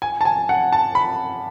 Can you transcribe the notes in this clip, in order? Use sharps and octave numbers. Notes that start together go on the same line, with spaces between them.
G#5
A5
G#5
F#5
A5
B5